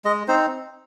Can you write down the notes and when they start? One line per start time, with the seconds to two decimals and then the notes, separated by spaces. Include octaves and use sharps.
0.05 G#3 D#5
0.28 C4 D#4 C5